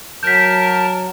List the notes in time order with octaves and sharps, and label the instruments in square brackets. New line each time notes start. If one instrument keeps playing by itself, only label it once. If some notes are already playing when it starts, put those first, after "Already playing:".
[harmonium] F#3 [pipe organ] A#4 A5 [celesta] G6 B6